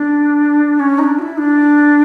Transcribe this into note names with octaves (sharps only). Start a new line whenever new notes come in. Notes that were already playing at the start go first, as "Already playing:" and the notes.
Already playing: D4
C#4
D#4
D4
F#4
E4
D4